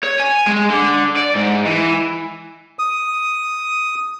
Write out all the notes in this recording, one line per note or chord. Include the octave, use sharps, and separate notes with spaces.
C#5
G#5
G#3
D3
D5
G#2
E3
D#6